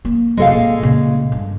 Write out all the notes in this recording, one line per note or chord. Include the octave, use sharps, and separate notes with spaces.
A#3
F1 A#1 G#3 A4 F5
A#2
A#2 C#3
G2